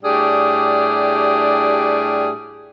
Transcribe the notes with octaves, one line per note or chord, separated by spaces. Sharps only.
A2 G3 D4 G4 G#4